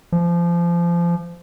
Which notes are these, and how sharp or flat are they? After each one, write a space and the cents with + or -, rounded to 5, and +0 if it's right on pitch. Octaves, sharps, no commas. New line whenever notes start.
F3 -25